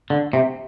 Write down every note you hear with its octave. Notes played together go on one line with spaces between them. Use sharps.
D3
C3